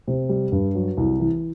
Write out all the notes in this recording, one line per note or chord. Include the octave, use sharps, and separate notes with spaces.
C3
G3
G2
F#3
C2
E3